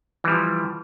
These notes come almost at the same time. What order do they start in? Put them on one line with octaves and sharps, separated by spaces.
E3 G3 F3